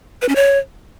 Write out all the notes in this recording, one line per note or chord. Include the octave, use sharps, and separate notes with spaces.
B4
C#4
C#5